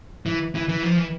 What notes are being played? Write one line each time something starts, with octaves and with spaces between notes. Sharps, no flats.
E3
E3
E3
F3
E3